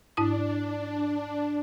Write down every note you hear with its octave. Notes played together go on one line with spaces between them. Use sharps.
G#2 D4 E4 D#6